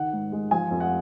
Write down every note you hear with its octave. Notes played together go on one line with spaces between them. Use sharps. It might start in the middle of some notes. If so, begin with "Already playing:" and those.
Already playing: D#3 F#5
G#2
G#3
F3 G#5
F2
F#5